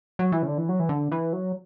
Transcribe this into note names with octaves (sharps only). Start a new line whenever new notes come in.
F#3
E3
C#3
D3
E3
F#3
E3
D3
E3
F#3